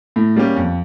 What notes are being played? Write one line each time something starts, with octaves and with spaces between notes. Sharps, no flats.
A2
G3 A#3 C#4 G4
F2